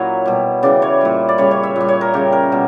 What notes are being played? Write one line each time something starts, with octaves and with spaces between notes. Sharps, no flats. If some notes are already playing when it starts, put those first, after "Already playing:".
Already playing: A#2 F#3 C#4 E4 C#5
B2 G3
C#3 E3 G3 D5
C#5
A#2 G3
D5
C#3 G3 C#5
C#5
E5
A#2 G3
C#5
A#4
C#3 G3 G4
A#4
B2 G3